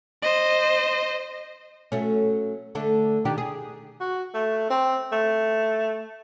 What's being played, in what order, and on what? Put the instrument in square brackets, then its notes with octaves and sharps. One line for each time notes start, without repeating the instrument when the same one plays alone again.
[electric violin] C5 D#5
[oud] F#3 A3 C#4
D3 A3 D4
D#3 D4 G4
G#4
[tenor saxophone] F#4
A3
C4
A3